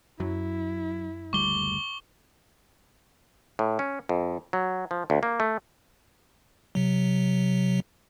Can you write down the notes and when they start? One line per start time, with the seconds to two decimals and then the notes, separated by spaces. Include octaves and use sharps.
0.20 F#2 F#3 E4
1.33 F#1 D2 G3 C#6 D6 G7
3.59 A2
3.79 C#4
4.09 F2
4.53 F#3
4.91 F3
5.10 D2
5.23 A#3
5.40 A3
6.75 C3 F#3